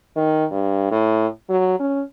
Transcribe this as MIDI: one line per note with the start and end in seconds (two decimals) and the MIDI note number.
0.16 0.45 51
0.51 0.88 43
0.91 1.27 45
1.49 1.78 54
1.79 2.02 61